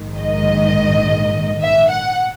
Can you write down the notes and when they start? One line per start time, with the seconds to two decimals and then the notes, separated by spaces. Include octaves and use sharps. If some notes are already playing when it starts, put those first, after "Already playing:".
Already playing: A#1 G#2 D#3
0.17 D#5
1.61 E5
1.90 F#5